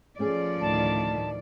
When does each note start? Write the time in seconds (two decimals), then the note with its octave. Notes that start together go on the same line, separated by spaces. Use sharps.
0.19 F3 A3 C#4 G#4 D5
0.61 D2 A2 D#3 A5